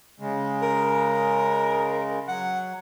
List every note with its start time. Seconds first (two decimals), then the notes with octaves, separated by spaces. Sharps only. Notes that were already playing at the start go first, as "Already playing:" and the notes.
0.20 C#3 G#3
0.62 A#4
2.28 F#3 F#5